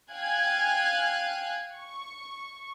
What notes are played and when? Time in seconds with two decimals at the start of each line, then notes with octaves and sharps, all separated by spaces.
0.11 F5 G5 G#5 F#6 G#6
1.75 C#6